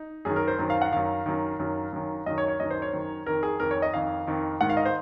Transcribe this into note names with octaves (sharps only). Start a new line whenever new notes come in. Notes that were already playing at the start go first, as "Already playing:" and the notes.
Already playing: D#4
F#2 D#3 G#4
A#4
C5
F#2 D#3
F5
F#5
F#2 D#3 F5
F#2 D#3
F#2 D#3
F#2 D#3
F#2 D#3 D#5
C#5
C#5
F#2 D#3 D#5
C5
C#5
F#2 D#3
F2 D#3 A#4
G#4
F2 D#3 A#4
C#5
D#5
F2 D#3 F5
F2 D#3
G#2 D#3 F#5
F5
D#5
C5